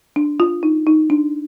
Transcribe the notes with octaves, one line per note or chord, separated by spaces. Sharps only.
D4
F4
D#4
D#4
D4